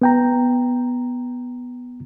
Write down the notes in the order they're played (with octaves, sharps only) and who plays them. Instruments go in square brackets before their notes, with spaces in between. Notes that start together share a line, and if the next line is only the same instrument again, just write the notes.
[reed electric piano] B3 G5 A#5